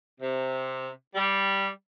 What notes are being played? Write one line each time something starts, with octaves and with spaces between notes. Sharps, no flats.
C3
G3